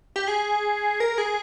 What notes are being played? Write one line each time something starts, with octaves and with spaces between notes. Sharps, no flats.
G4
G#4
A#4
G#4